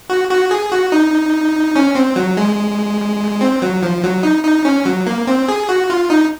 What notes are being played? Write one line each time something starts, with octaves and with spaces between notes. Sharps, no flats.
F#4
F#4
G#4
F#4
D#4
C#4
C4
F#3
G#3
C4
F#3
F3
F#3
D#4
D#4
C#4
F#3
A#3
C4
G#4
F#4
F4
D#4